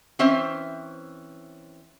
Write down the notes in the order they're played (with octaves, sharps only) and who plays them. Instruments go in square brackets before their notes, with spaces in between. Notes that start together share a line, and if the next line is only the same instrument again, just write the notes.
[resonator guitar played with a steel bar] E3 C4 C#4 C5 E5